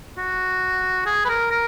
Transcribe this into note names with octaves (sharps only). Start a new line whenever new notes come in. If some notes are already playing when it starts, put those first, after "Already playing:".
F#4
G#4
B4
A#4
A#4